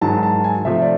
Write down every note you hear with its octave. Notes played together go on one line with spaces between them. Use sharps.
G#2 D#3 F#3 A5
A5
G#5
C3 F3 A3 E5
D5